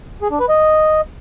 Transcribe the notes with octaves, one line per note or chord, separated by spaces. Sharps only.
G#4
D4
B4
D#5